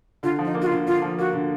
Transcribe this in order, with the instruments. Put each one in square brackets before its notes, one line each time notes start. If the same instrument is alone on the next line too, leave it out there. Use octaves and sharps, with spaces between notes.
[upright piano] D3 [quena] F4
[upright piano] F3
[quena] D#4
[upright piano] A#3
[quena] F#4
F4
[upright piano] D3
[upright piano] D3 [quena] F4
[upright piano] F3
[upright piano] A#3 [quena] F#4
[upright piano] D3